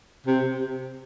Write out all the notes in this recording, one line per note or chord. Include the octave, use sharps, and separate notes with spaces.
C3